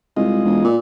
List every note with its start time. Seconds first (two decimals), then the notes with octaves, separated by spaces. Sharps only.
0.17 C2 G#3 F4 D#5
0.45 E1
0.64 A#2